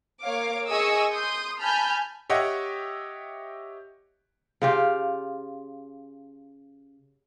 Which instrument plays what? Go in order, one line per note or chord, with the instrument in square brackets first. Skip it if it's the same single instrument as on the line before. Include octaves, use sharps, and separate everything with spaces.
[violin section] A#3 C#5 F5 D6
G#4 D#5 G#5 C#6 D#6 E6
C6 D#6 G6
G#5 A5 B5 F6 G6
[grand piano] G4 C#5 D#5 E5 F#5 G5
[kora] C#3 F4 G4